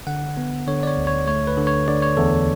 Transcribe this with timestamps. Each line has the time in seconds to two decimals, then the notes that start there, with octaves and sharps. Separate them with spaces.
0.07 D3 F#5
0.37 B3
0.67 D3 C#5
0.83 D5
0.87 C#5
0.97 D2
1.07 C#5
1.27 A3 C#5
1.47 B4
1.57 D3
1.67 C#5
1.88 D3 D5
2.02 C#5
2.17 E2 A4